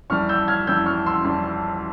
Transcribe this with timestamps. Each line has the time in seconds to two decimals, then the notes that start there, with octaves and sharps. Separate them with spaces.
0.10 F2 E3 G3 C#6 F6
0.29 E6 G6
0.48 F6 G#6
0.67 F2 E3 G3 E6 G6
0.86 C#6 F6
1.06 C6 E6
1.25 F2 E3 G3